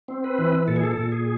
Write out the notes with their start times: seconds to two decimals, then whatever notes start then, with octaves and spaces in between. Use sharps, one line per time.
0.08 C4
0.24 B4
0.39 E3
0.67 A#2 A4
0.76 G#4
0.83 A4
0.97 A#2
1.12 G#4